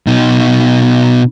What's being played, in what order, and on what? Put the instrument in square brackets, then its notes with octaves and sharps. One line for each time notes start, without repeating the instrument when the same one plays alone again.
[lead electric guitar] B2 D#4